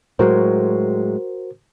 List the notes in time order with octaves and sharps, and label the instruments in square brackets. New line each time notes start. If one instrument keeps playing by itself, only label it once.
[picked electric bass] A2 F#3 G#3 [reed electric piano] F#4 A#4 C5